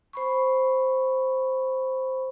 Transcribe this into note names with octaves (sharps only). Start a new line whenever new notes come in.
C5 B5 C#6